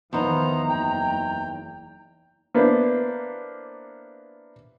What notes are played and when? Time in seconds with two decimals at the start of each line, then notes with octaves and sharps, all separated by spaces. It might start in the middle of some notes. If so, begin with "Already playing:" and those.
0.13 E2 D#3 F3 B3 D#4 C5 A#5
0.69 F#1 G5
2.54 A#3 B3 D4 E4 B4 C5